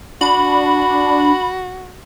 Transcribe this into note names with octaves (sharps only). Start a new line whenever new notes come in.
D4 F#4 B5